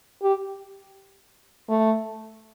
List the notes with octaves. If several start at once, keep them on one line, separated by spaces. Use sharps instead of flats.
G4
A3